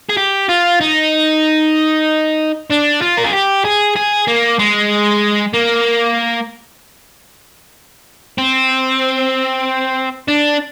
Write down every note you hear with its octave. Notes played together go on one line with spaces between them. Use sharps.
G#4
G4
F4
D#4
D4
F4
A#4
G#4
G4
G#4
G#4
A#3
G#3
A#3
C4
D4